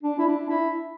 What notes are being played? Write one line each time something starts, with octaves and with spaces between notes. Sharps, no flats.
D4
E4
D4
E4